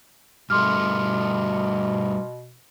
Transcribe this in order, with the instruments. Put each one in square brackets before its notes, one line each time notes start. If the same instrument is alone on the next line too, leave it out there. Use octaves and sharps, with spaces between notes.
[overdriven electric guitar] G2 A3 [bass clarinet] B2 [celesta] C6 D6 F6